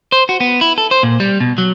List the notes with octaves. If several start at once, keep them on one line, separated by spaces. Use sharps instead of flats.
C5
F#4
B3
E4
A4
C5
A#2
G3
B2
F#3